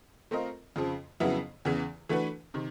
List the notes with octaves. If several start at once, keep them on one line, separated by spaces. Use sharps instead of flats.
A3 C4 F4 A#4 D#5
F2 C#3 F3
F2 C#3 F#3 B3 E4
E2 C#3 E3
E3 A3 D4 F#4 B4
C3 D#3